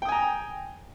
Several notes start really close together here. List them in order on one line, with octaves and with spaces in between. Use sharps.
G5 D#6 G#5 A#5